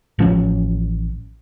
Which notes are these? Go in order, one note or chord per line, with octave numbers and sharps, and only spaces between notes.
A1 F3 C#4